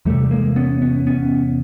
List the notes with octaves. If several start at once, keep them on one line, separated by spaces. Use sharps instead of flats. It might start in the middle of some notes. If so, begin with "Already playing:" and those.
E2 C3 G3 A3
G#3 A#3
B3 C#4
B3 C#4
B3 C#4